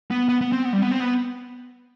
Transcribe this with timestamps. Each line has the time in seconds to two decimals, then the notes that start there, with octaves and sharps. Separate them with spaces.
0.11 B3
0.29 B3
0.41 B3
0.52 C4
0.65 B3
0.73 G3
0.82 B3
0.91 C4
1.00 B3